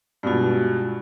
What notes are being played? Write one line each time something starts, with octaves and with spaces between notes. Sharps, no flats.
G2 B2 G#3 F4